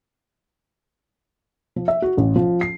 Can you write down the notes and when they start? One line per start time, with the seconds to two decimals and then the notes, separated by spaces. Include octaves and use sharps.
1.76 F3
1.88 E5
2.02 F#4
2.17 A1
2.36 F3
2.61 C7